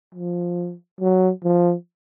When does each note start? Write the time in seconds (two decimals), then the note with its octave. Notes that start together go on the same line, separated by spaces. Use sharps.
0.15 F3
1.01 F#3
1.44 F3